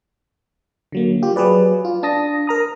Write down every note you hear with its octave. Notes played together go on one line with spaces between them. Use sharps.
D3 F#3 A#3
F4 G4
F#3 G#4 B4 D5
F4
D4 A5 D#6 A#6
A#4 A#5 D#6